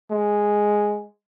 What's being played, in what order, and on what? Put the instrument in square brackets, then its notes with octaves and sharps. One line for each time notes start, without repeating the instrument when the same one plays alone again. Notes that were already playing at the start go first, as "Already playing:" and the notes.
[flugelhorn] G#3